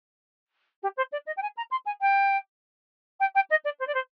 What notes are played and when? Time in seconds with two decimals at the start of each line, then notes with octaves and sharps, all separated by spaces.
0.82 G4
0.97 C5
1.12 D5
1.26 D#5
1.37 G5
1.42 G#5
1.57 A#5
1.71 C6
1.85 G#5
2.01 G5
3.20 G5
3.35 G5
3.50 D#5
3.64 D5
3.79 C5
3.87 D5
3.94 C5